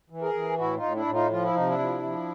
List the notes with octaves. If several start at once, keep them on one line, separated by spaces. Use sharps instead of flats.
E3
G#4 A#4
E3
A2 E4 F#4
D#4 F4
A2
D4 E4
A2
D#4 F4
F3 F4
E4
C3 D#4
D4 E4
F3
F3